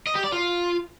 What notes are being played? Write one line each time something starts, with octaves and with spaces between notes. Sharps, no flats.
D#5
G4
D5
F4